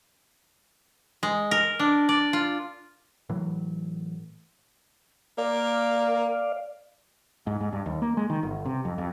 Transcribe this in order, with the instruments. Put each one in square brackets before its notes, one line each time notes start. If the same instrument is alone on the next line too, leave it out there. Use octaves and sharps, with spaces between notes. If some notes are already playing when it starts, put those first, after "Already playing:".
[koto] G#3
A#4
D4
D5
F4
[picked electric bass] A2 E3 F#3
[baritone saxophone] A#3 [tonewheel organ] D5 F5
[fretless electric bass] G#2
G#2
G2
D#2
A#3
G#3
D#3
G1
C3
F2
F2